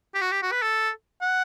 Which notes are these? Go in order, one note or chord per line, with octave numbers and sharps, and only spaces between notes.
G4
F#4
G4
F#4
B4
A4
F#5